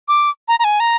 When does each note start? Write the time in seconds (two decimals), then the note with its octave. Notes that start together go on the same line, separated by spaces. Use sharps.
0.08 D6
0.48 A#5
0.59 A#5
0.64 G#5
0.80 A#5